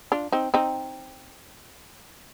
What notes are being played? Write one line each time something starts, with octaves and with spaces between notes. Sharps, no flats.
D4 F4
C4 D#4
C4 D#4